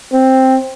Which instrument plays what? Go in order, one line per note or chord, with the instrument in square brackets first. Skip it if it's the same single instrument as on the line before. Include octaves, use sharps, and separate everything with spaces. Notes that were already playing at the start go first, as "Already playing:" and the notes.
[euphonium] C4